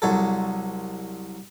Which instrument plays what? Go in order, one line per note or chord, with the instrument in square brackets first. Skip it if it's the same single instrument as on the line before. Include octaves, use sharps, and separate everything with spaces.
[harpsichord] C2 F#3 A4